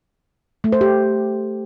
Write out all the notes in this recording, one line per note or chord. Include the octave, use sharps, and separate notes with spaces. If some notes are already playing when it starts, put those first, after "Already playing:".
A3
C5
G4